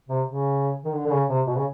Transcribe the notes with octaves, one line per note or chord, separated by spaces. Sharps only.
C3
C#3
D#3
D3
D3
C#3
C3
B2
C#3